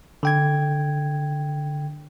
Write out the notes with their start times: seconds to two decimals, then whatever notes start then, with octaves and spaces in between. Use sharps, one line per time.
0.23 D3 G5 G#6